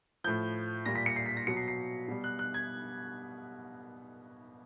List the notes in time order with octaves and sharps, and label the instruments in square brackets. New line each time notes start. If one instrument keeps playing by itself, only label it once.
[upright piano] A2 F3 G6
A#2 G3 A#6
B6
C#7
C7
B6
A#6
B2 F#3 C#7
C7
C7
B2 G3
F#6
F#6
G#6